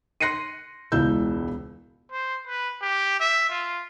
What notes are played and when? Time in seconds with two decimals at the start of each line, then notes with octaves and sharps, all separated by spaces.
0.20 C6 F#6 A#6 C7 C#7 D#7
0.92 E1 C#2 E4 E6 G6
2.12 C5
2.47 B4
2.82 G4
3.20 E5
3.49 F4